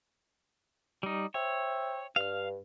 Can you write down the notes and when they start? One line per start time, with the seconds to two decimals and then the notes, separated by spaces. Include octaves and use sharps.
1.03 G3 D#4
1.34 C5 C#5 E5 G5
2.16 G2 F5 F6